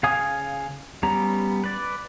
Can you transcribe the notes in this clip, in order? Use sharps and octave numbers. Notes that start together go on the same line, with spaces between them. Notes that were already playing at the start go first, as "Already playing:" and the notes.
C#3 F5 G#5 D#6
G3 B3 C#4 A#5
B4 D5